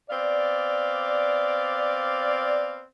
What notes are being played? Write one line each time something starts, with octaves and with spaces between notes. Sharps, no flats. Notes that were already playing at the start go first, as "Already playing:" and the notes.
B3 C4 D5 F5